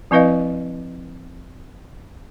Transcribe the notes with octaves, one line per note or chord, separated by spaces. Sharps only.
F3 C4 E4 B4 D#5 F5